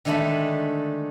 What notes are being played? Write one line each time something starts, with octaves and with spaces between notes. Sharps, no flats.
D3 D#3 G#3 A3 A5 B5